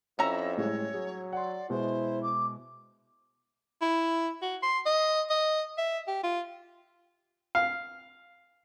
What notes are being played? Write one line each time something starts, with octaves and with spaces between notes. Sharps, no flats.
F2 C#4 E4 A#5 E6 A#6 E7
A2 G3 G#3 C#5
F#3 G#4
D5 F#5 C6
B2 G#3 E4 C5
D6
E4
F#4
C6
D#5
D#5
E5
G4
F4
F5